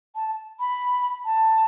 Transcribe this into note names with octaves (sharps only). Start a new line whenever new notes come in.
A5
B5
A5